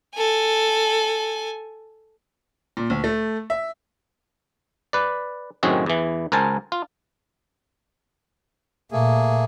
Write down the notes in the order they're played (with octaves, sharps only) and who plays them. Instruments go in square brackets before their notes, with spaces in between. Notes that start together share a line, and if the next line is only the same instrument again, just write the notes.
[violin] A4 G#5
[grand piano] A#2
D2
A3
E5
[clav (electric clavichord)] B4 D5
F#2 A2 D#3 C4 F#4 G#4
E2 E3
C#2 A#4 C5 G#5 A5
F4
[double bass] A#2 [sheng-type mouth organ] A3 A#3 G#4